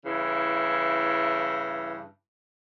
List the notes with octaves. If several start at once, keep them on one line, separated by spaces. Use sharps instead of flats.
G2 C#3 E3 E4